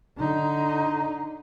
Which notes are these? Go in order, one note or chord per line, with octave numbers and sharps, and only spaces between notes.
D3 D#4